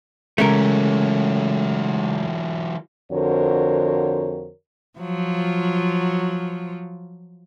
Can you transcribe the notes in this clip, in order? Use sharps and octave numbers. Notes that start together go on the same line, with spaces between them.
C#3 E3 F#3 G#3 A3 C#4 A#4
F2 D3 F#4 A#4 C5 C#5
F3 F#3 F4